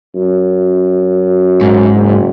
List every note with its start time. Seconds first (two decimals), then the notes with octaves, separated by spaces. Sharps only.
0.15 F#2
1.61 G#2
1.95 F#1